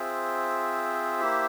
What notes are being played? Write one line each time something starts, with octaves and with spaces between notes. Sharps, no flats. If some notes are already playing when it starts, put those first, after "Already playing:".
Already playing: C4 F4 G#4 C5 E5
A#3 E4 G4